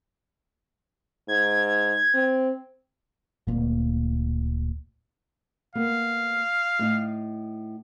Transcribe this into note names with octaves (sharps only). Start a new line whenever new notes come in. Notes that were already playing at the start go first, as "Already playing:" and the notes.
G#2 G#6
C4
D1 A#2
A#3 B3 F5
A2 D#4